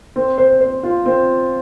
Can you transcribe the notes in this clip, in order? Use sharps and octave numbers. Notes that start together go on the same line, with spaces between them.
C4
C5
C5
F4
C4